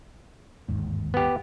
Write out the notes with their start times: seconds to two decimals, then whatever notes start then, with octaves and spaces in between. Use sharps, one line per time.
0.69 G1 D#2 G#2
1.14 B3 G4